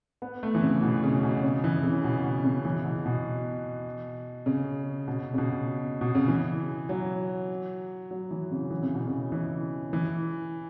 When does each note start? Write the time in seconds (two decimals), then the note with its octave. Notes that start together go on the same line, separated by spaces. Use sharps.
0.22 B3
0.43 A3
0.55 E3
0.62 C#3
0.83 B2
1.03 C#3
1.23 B2
1.43 C#3
1.64 E3
1.83 C#3
2.04 B2
2.24 B2
2.44 C#3
2.65 E3
2.85 B2
3.06 B2
4.46 C#3
5.08 B2
5.34 C#3
5.38 B2
6.01 B2
6.15 C#3
6.28 E3
6.89 F#3
8.11 F#3
8.31 E3
8.51 C#3
8.71 E3
8.83 C#3
8.95 B2
9.07 C#3
9.32 E3
9.93 E3